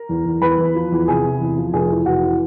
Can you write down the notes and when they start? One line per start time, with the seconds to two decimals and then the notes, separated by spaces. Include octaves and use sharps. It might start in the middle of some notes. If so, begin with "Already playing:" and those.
Already playing: A#4 A#5
0.09 E2
0.26 E2
0.42 E2 B4 B5
0.58 E2
0.75 F3
0.92 E2
1.08 C3 G#4 G#5
1.24 C3
1.40 E2
1.57 F3
1.73 F1 G#4 G#5
1.90 E3
2.06 F1 F#4 F#5
2.22 E3